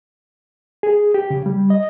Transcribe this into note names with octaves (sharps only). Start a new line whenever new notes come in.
G#4
G4
C#3
G3
D#5